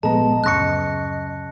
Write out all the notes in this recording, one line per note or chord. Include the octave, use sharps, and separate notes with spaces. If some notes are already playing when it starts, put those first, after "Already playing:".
G1 A#2 F3 G#3 B3 D#5 A5 A#5
D1 F#2 C#3 C#6 F#6 A#6 C#7